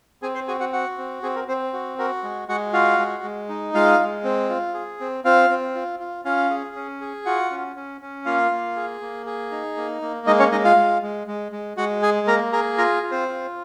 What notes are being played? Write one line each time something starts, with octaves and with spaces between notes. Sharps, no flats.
C4 G#4 G#5
C5 C6
F#4 G#4 G#5
F#4 F#5
F#4 F#5
C4
C4 G#4
A#4
C4 C5
F#4
F#4 A#4
G#3
G#3 F#4 F#5
F4 F#4 F5
G#3
G#3
D#4
G#3 F4 F5
G#3
C4
F4
G#4
C4
C4 F4 F5
C4
F4
F4
C#4 F4 F5
G#4
C#4
G#4
F4 F#4 F#5
C#4
C#4
C#4
A#3 F4 F5
A#3
G#4
A#3
G#4
D#4
A#3
A#3
G#3 D#4 D#5
C#4 C#5
G#3 D#4 D#5
F4 F5
G#3
G#3
G#3
G#3
G#3 F#4 F#5
G#4 G#5
A#3 A#4 A#5
G#4 A#4 A#5
F4 A#4 A#5
F4
C4 C5
F4